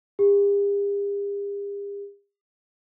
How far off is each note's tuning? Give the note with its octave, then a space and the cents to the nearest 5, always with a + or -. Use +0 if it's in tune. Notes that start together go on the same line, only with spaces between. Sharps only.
G4 +45